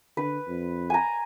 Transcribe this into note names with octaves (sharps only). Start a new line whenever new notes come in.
D3 B4
F2
G#5 A#5